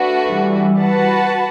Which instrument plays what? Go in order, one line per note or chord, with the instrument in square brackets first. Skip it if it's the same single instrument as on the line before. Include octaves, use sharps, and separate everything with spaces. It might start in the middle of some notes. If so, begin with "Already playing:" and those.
Already playing: [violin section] A3 D4 F#4 B4
[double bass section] E3 G3
[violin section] F#4 B4 F#5 A5